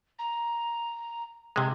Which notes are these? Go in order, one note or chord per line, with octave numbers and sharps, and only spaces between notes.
A#5
C3 G#3 G#6